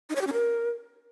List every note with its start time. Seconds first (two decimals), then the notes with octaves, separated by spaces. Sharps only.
0.10 D#4
0.15 C#5
0.21 G4
0.27 C#4
0.33 A#4